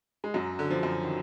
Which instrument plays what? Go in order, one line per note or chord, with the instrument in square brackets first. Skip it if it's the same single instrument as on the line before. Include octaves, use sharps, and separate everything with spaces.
[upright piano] G#3
[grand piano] F#2 [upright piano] F#3
[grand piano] D3
[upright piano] F3
[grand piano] F#2
[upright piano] D#3